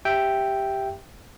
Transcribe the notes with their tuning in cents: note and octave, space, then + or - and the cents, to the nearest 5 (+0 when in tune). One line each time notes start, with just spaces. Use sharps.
G4 +0 E5 +0 G5 +0